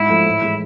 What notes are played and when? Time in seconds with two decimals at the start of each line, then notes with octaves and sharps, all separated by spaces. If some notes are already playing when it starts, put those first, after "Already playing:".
Already playing: G#2 E4
0.09 F3 A3
0.26 A2
0.42 E3 G#3